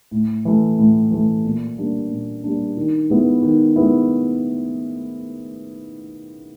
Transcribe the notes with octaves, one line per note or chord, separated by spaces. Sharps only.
A2
E3 A3
A2
E3 A3
A#2
G3 A#3 D4
A#2
G3 A#3 D4
D#3
G#3 B3 E4
D#3
G#3 B3 E4